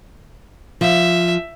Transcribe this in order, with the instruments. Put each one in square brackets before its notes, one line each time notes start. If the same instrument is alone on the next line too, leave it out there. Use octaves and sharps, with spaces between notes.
[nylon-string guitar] F3 [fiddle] E5